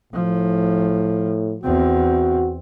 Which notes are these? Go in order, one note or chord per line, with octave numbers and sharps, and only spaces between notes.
A2 F3
E2 C4 F#4